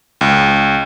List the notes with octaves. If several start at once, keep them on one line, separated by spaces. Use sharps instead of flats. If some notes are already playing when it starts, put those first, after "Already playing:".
C#2